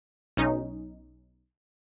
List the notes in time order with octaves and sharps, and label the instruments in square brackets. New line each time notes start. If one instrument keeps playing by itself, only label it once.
[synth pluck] B1 C#4 D#4